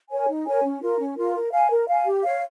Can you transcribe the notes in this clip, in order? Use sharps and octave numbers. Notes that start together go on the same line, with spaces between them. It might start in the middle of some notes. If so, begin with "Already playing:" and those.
A#4 C#5 G#5
D#4
A#4 C#5 G#5
C#4
F4 A#4
C#4
F4 A#4
A#4
F5 G#5
A#4
F5 G#5
G4
C#5 F5